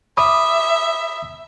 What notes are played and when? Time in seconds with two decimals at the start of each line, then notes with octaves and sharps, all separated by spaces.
0.17 E5 B5 D6 D#6